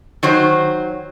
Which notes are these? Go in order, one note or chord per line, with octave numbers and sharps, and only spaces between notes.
D#3 F#3 C5